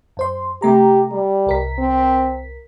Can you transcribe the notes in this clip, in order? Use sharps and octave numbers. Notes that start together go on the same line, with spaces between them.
F#2 C5 C6
C3 A3 G4 A#5
G3
C2 A#4 B6
C4